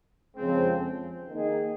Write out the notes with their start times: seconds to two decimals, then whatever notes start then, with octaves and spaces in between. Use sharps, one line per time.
0.36 F2 C#3 F3 G#3 C4
1.29 D#3 A#3 D#4 G#4